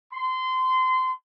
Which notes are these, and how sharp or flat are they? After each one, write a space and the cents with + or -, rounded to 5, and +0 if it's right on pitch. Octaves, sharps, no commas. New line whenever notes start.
C6 -25